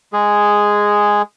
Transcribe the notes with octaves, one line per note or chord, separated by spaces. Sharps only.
G#3 G#4